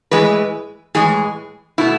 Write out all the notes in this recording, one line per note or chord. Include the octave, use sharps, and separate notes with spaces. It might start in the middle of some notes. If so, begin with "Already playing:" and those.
A2 E3 G#3 B4
A2 E3 G#3 G#4
B2 A3 E4